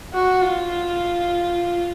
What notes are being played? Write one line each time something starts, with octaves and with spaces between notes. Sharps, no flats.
F#4
F4